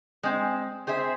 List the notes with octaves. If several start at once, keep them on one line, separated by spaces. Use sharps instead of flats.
G#3 C4
C4 G#4 C5 E5